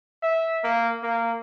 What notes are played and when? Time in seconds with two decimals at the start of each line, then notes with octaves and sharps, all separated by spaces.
0.23 E5
0.64 A#3
1.03 A#3